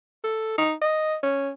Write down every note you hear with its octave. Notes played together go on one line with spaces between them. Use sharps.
A4
D#4
D#5
C#4